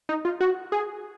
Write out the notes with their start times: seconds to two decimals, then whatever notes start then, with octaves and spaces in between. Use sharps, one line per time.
0.09 D#4
0.25 F4
0.41 F#4
0.72 G#4